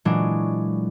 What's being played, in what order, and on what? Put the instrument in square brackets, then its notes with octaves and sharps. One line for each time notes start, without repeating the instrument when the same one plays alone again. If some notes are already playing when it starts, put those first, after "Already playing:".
[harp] A#2 E3 F#3 G#3 C#4 D4